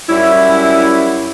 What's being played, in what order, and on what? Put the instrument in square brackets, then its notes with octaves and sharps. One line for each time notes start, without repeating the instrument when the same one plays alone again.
[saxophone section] F#2 G3 C#4 E4